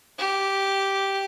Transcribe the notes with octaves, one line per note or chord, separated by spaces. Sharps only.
G4